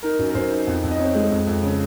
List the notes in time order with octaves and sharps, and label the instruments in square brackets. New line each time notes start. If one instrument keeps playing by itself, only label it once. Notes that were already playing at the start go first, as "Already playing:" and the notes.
[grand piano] D#4 A#4
F#2
A#4
F#2 C5
D#4
F2
F2
D#5
C4 C#5
G#3
F2
F2
C#3